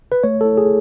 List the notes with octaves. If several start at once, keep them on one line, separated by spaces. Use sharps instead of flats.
B4
A3 C#5
E4 A4
G#4